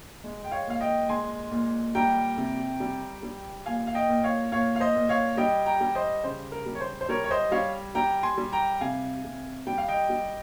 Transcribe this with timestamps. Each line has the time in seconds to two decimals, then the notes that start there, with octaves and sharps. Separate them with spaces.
0.24 G#3
0.44 G5
0.51 C#5 F5
0.67 A#2 F5
0.81 D#5 G5
1.09 G#3 G#5 C6
1.51 A#2
1.95 G3 G5 A#5
2.38 C3
2.80 G3
3.23 G3
3.66 A#2 F5 G#5
3.87 F5
3.94 D#5 G5
4.09 A#2
4.24 C#5 F5
4.52 A#2 C#5 F5
4.76 F5
4.80 C5 D#5
4.96 A#2
5.09 C#5 F5
5.37 G3 D#5 G5
5.66 G5 A#5
5.81 G3
5.95 C5 D#5
6.24 C#3 C5
6.52 A#4
6.66 G3
6.75 C#5
6.81 C5
7.01 C5
7.09 G3 A#4 C#5
7.24 C#5
7.31 C5 D#5
7.52 G3 C#5 F5
7.95 G3 G5 A#5
8.23 G#5 C6
8.38 G3
8.52 G5 A#5
8.81 C3 F5 G#5
9.24 C3
9.67 G3 G5
9.78 F5
9.88 D#5 G5
10.10 G3